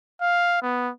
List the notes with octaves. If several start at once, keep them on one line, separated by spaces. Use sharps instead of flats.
F5
B3